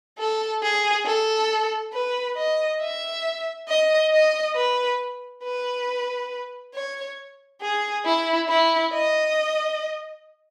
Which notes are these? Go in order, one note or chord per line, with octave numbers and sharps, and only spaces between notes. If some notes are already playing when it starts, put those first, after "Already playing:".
A4
G#4
A4
B4
D#5
E5
D#5
D#5
B4
B4
C#5
G#4
E4
E4
D#5